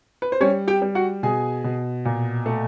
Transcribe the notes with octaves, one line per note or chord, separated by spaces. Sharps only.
B4
C5
G3 C#4 C#5
G4 G5
G3
F#4 F#5
B2 G#4 G#5
B2
A#2
A3